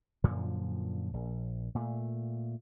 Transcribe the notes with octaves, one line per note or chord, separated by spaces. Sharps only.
F#2 A#2 D3 F3
A#1
A#2 A3